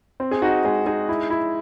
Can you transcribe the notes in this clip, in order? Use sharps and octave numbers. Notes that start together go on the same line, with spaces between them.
C4
G#4
D#4 F#4
G#3 G#4
D#4 G#4
E4
E4